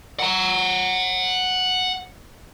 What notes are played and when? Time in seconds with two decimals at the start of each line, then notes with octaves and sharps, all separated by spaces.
0.20 F#5 A#5